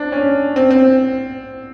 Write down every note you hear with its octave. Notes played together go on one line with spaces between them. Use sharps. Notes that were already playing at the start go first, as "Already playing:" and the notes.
Already playing: C4 D4
C#4
C4
C4